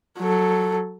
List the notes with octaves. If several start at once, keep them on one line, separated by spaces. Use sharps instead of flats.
F#3 A4